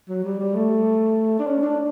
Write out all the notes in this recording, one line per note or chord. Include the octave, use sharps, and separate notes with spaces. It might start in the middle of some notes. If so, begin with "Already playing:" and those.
F#3
G3
G3
A3
D4
C#4
D4